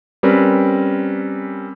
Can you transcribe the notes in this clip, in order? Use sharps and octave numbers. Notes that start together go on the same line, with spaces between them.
G3 C4 C#4 A#4 B4